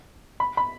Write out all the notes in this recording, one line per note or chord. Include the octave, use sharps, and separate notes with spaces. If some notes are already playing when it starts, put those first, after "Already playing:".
B5
B5